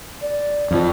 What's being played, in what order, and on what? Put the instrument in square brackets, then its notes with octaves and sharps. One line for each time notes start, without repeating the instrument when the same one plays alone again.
[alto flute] D5
[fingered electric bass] F2 F3